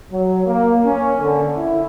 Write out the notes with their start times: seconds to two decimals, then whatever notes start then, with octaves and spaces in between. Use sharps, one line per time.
0.11 F#3
0.46 A#3
0.85 C#4
1.20 D3
1.56 E4